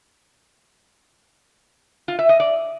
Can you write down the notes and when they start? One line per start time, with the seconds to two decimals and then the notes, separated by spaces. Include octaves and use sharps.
2.08 F4
2.19 E5
2.29 D#5
2.40 D5